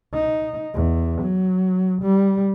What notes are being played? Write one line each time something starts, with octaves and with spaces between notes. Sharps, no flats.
D#4
E2
F#3
G3